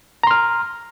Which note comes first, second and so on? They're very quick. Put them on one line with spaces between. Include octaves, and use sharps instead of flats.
A#5 C6 F6